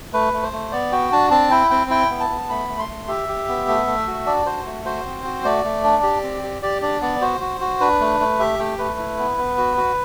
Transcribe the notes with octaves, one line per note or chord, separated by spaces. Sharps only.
A3 B4
A3
C5
A3
B3 D5
F#4 G5
D4 A5
C4 A5
E4 G5
C4 G5
E4 G5
B3
A5
B3
A3 B5
A3
C6
A3
G4 E5
G4
B3
A3
A3
F#4
D4 D5
F#4 C5
A3
F#4 C5
C4
F#4
A3 D5
A3
D4
G4
C4
G4
G4 D5
D4 D5
B3 D5
F#4 C5
F#4
F#4
D4 B4
A3
A3
G4 E5
A3 G5
A3 B4
E4
B3
B3
F#4
F#4